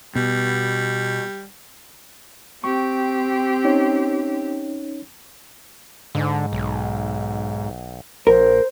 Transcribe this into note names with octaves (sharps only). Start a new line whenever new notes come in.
B2 G3
C4 G4 C#6
C#4 D#4 C#5
G#2 D3
B1
A#1 A#4 C5